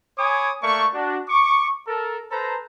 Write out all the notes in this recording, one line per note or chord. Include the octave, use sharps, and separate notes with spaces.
C#5 G#5 B5 D6 D#6
A3 A#3 D5 C#6
D4 F#4
C#6 D6
A4 A#4
A4 B4 C5 A#5